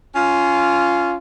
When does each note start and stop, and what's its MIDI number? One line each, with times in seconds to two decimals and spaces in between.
0.16 1.16 61
0.16 1.16 65